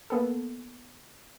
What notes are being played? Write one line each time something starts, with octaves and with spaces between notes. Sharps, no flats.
A#3 B3 A4